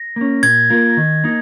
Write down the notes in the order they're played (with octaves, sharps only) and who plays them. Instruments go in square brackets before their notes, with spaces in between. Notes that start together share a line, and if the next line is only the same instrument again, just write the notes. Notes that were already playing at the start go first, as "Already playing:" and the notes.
Already playing: [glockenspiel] A#6
[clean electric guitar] A#3 C#4
[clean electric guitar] A#2 [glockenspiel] G#6
[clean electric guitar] A#3 F4 A#4
D#3
A#3 D#4